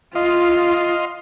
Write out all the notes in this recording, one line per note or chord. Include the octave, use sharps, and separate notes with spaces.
F4 D#5 F5 C6